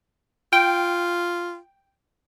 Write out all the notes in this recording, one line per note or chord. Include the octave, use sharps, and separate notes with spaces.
F4 G5